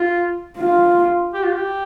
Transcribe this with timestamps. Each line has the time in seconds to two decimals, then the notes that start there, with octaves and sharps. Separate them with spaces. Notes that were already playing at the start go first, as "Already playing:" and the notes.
Already playing: F4
0.58 F4
1.34 G4
1.43 F4
1.55 G4